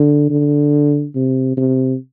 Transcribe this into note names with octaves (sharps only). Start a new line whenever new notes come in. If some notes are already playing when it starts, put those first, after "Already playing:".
Already playing: D3
D3
C3
C3